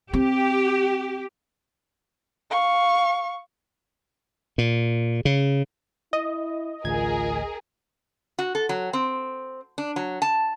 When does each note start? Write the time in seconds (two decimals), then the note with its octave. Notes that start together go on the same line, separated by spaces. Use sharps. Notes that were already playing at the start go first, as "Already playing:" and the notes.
0.13 C4 G4
2.50 F5 C#6
4.58 A#2
5.25 C#3
6.13 E4 D#5
6.85 A1 D2 F4 G#4 A#4 G#6
8.39 F#4
8.55 A4
8.69 F#3
8.93 C4
9.78 D4
9.96 F#3
10.22 A5